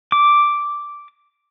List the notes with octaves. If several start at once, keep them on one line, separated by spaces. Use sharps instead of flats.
D6